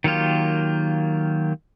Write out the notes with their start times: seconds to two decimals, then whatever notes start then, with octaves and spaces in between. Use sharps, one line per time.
0.04 D#3 F#3 A#3 F4 G4